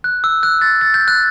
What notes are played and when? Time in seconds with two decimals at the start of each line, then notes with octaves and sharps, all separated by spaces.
0.04 F#6
0.24 E6
0.43 F#6
0.61 A6
0.81 A6
0.94 G6
1.08 F#6